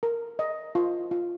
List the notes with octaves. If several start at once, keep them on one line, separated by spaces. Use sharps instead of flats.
A#4
D#5
F4
F4